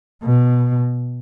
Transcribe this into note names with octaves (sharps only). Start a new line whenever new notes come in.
B2